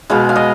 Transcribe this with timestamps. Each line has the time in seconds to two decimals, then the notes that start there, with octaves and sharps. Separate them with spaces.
0.10 B2 G#3 F5
0.29 F5
0.36 D#5